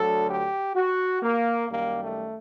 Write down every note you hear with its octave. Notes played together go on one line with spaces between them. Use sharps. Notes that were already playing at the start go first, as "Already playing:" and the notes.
Already playing: D2 D3 F#3 A4
G4
F#4
A#3
F#2 D#3 G3 A#3
A3